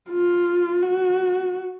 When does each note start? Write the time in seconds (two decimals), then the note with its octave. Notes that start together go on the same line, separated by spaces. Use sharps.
0.10 F4
0.82 F#4